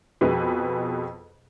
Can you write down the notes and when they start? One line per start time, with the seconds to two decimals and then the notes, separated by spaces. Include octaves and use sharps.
0.21 F2 B2 G#4 B4